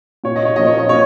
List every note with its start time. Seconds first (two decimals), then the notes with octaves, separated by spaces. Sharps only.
0.24 A#2 C#5
0.36 D#5
0.45 C#5
0.56 F3 A#3 C#4 D#5
0.67 C#5
0.79 D#5
0.89 A#2 C#5